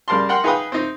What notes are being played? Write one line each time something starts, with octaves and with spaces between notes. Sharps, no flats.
C#3 G3 A#4 A5 C6
A#4 F#5 G5 C6
D#4 G#4 B4 F5 G5 D#6
C4 D#4